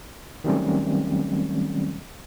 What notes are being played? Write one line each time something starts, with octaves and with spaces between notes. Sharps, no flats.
D#3 F#3 G3 A3 C4 C#4